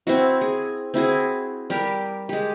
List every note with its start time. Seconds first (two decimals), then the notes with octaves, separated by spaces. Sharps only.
0.07 C4 E4 F#4
0.41 G#4
0.94 C4 E4 F#4 G#4
1.70 G3 G4 A#4
2.29 G#3 G4